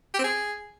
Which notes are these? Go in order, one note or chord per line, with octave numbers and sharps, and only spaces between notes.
G4
C4
G#4